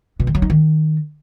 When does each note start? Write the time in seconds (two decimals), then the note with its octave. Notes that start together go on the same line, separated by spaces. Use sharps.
0.20 B2
0.27 D#3
0.35 F#3
0.42 D#4
0.50 D#3